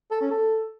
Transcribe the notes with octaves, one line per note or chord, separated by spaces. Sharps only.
A4
C#4
A4